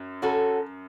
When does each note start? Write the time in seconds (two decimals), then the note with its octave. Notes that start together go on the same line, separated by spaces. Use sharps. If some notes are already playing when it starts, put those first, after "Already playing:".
Already playing: F#2
0.22 C#4 F#4 A4